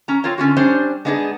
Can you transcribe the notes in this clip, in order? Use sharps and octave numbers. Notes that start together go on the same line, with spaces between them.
C#4 A#5
C4 F4 A#4 C#5
D3 C#4 F4 F#4
G3 C#4 D4 C5
G#3 B3 D4 D#4 G#4